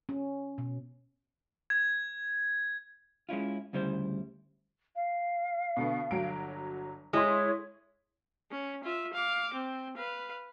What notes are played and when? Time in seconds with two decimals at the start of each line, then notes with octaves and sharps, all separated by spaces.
0.09 C#4
0.58 B2
1.70 G#6
3.29 G#3 C#4 E4 F4
3.73 D2 C#3 G3 E4 C5
4.95 F5
5.77 B2 D3 B3
6.11 G1 F#3 D7
7.13 G#3 E4 C#5 C6
8.51 C#4
8.83 F4 E5
9.13 F5 D6
9.53 C4
9.97 B4 F5